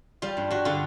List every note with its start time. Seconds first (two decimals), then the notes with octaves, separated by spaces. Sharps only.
0.22 G3 F4
0.37 G2
0.50 G2 F#4
0.65 D3 F4